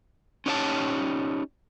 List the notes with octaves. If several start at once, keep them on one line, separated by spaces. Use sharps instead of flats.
C#4 D#4 G4 C#5 G5 A5